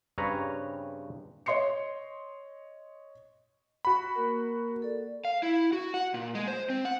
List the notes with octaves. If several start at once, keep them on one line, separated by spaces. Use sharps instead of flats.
G2 C#3 C4 B4 C#5 A#5
C#5 D#5 C6 C7 C#7
F#4 B5
A#3 A#4
A4 D5
F5
E4
F#4
F#5
A#2
G#3
C5
C4
F#5